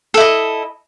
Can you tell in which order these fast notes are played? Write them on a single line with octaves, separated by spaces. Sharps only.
A4 E4 D#5